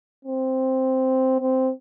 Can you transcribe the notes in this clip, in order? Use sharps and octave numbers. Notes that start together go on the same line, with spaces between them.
C4
C4